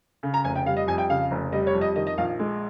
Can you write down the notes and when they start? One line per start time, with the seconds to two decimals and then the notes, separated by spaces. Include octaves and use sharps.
0.23 C#3
0.34 A#5
0.44 F1 G#5
0.56 G5
0.66 G3 F5
0.77 D#5
0.87 F2 G#5
0.98 G5
1.09 C#3 F5
1.31 F1
1.52 G3 D#5
1.67 C#5
1.74 F2
1.81 D#5
1.96 D#3 D#5
2.07 D#5
2.18 A#1 F5
2.39 G#3